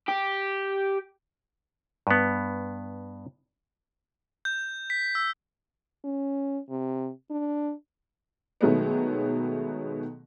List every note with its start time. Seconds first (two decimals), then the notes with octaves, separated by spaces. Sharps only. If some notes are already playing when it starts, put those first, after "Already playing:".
0.08 G4
2.07 G2 B3
4.45 G6
4.90 B6
5.15 E6
6.04 C#4
6.69 C3
7.30 D4
8.61 B2 D#3 F#3 G#3 A3 B3